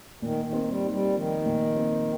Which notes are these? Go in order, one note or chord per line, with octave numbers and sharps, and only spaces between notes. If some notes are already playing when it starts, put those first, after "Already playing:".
A#2 D#3
D#3
C4
G3
D#4
G3
D#3 F3
A#2
C4